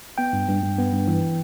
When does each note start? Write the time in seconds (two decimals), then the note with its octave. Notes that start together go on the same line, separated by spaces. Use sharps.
0.18 B3 G5
0.33 G2
0.48 G2
0.63 G2
0.78 B3
0.93 G2
1.08 E3